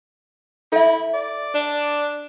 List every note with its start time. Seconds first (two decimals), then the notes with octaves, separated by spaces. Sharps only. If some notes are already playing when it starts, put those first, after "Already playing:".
0.72 E4 A4 E5
1.14 D5
1.54 D4